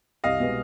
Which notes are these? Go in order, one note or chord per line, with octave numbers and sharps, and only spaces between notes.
C2 D#5 F5
B2 G#3 B3